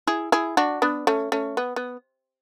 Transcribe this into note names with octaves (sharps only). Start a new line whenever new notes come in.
E4 G#4
E4 G#4
D4 F#4
B3 D4
A3 C#4
A3 C#4
B3
B3